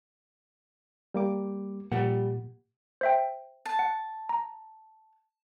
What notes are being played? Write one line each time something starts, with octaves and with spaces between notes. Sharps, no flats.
G3 A#3 D6
A#2 F3 G3 G4 F#5
C5 E5 G5
A5
F#5
A#5